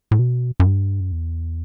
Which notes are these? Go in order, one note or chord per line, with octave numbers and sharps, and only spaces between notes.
A2
B2
F#2
G2
F#2
E2